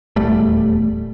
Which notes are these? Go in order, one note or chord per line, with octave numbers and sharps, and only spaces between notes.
D#1 E2 G3 A3